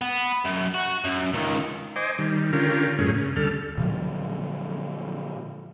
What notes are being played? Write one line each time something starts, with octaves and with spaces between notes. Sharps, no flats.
B3
F#2
F#4
F#2
C#2 D#3
C5 D#5 G#5 D6
D#3 G3
D3 C#4 F4 G4 A#4
F#2 A2 G#3 C#4
C#3
D2 G3 A4 F6
A#2 D3 F3 F#3